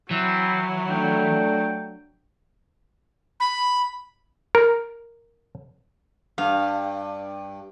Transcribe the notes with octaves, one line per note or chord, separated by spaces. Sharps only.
E3 F#3 C4
A3 D4 G5
B5
A#4
G2 F5